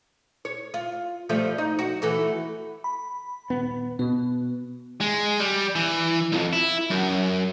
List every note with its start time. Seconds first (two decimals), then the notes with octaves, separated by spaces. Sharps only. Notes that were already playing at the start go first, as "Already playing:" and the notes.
0.45 C#5
0.74 F4
1.29 F3 G3 A3
1.58 D#4
1.79 F#4
2.02 E3 A3 F#4
2.84 B5
3.50 D#1 B3
3.99 B2 B3
5.01 G#3
5.40 G3
5.75 E3
6.32 B1 F2
6.53 E4
6.90 F#2